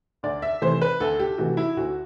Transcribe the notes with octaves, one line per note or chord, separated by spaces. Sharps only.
D2 D5
E5
C3 E3 A3 C5
B4
D2 A4
G4
C3 E3 A3 F#4
E4
D2 F#4